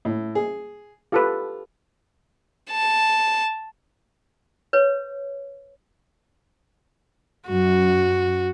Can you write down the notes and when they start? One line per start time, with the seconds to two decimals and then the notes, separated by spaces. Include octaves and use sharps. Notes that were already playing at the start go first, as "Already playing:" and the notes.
0.05 A2
0.35 G#4
1.12 F4 G4 A4 B4
2.71 A5
4.73 B4 C#5
7.49 F#2 F#4